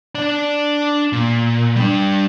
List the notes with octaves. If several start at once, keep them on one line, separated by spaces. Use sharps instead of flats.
D4 D5
A#2
G3 D4